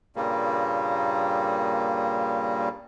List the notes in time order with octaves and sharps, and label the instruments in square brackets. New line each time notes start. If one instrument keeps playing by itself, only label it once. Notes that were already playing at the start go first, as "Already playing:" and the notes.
[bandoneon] G2 A#2 C#3 G3 A#3